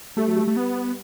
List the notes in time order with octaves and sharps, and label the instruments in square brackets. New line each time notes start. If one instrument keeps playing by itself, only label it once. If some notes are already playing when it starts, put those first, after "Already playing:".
[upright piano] G3 [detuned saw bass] A3
[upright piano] F#3
G3
[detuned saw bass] A3
B3